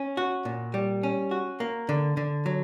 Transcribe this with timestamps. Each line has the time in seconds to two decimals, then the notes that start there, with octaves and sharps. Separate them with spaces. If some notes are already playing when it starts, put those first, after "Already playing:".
Already playing: C#4
0.17 F#4
0.45 A#2
0.74 G3
1.03 C#4
1.31 F#4
1.60 A#3
1.89 D3
2.17 D3
2.46 F#3